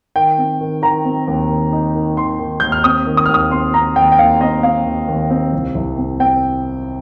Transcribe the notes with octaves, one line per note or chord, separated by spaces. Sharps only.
D#3 G5
C4
D#3
D#3 A#5
C4
D#2
D#3
D#4
D#3
D#3 C6
D#3
D#2 G6
F6
C4 D#6
D#3
D#6
F6
D#2
D#6
C4 C6
C4 A#5
D#2 G5
G5
D#2 F5
C4 D#5
C4 F5
D#2
D#2
C4
C2
C2
C4
C4 G5